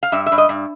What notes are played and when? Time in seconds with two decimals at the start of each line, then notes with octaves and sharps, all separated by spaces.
0.03 F5
0.12 G2 E5
0.26 E5
0.32 G2
0.38 D#5
0.49 G2